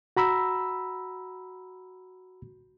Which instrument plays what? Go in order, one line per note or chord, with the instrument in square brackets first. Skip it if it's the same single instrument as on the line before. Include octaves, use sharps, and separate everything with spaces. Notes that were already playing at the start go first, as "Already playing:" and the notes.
[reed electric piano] F#4 A#5 B5 E6